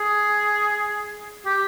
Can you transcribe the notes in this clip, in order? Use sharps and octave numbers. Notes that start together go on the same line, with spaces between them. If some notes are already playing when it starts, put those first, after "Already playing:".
Already playing: G#4
G4